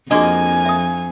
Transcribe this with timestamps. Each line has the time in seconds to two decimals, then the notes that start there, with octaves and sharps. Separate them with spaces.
0.11 F2 F3 A#3 D4 F#4 G#4 D#5 G#5
0.65 E5 D#6